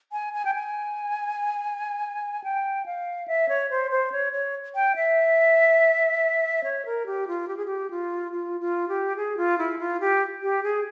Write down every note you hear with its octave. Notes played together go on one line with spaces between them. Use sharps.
G#5
G#5
G5
G#5
G5
F5
E5
C#5
C5
C5
C#5
C#5
G5
E5
C#5
A#4
G4
F4
G4
G#4
G4
F4
F4
F4
G4
G#4
F4
E4
F4
G4
G4
G#4